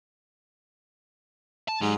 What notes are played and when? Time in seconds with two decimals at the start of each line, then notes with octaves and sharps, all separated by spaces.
1.68 A5
1.81 G#2 F#3 G4